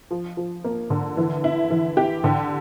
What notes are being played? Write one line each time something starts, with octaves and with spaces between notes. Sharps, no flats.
F3
F3
A#3
D3
E3
E4
E3
G4
D3